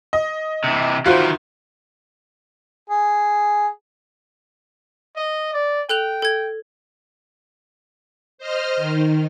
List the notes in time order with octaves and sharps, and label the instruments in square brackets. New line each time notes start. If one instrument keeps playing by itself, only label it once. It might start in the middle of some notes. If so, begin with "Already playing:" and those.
[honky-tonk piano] D#5
[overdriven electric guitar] C3 E3
[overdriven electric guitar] D#3 E3 [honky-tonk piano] F4 F#4 C5
[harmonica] G#4
[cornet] D#5
D5
[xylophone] A4 F#6 F7 [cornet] G5
[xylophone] A4 G#6
[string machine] C5 D#5 F6
D#3